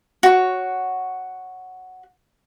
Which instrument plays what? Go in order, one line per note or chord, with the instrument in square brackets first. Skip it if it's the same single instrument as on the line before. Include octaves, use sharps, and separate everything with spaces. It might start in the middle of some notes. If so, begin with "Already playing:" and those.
[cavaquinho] F#4 C#5